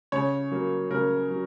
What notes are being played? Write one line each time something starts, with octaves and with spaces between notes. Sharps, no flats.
C#3 C#5
F#3 A#3
C#3 A#4
F#3